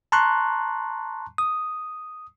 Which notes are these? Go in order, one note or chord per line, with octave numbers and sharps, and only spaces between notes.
A5 A#5 C6 C#6 F#6
D#6